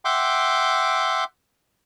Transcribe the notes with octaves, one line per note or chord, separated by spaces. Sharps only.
E5 F#5 G5 C6 D6